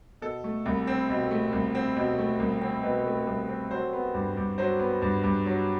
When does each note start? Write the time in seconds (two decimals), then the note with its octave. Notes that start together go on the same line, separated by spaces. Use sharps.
0.22 B2 A4
0.44 A3
0.66 C2
0.87 C4
1.10 B2
1.31 A3
1.53 C2
1.75 C4
1.96 B2
2.19 A3
2.39 C2
2.62 C4
2.83 B2 B4
3.06 A3
3.27 C2
3.49 C4
3.71 F#3 C5
3.93 B3
4.14 G2
4.37 G2
4.58 F#3 C5
4.80 B3
5.02 G2
5.24 G2
5.46 F#3